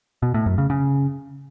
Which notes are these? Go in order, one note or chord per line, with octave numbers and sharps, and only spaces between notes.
B2
A2
F#2
C#3
C#3